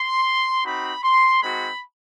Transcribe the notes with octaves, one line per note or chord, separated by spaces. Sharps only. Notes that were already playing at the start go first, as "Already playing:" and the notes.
Already playing: C6
C4 D#4 F#4 B5
C6
G#3 C4 D#4 F#4 B5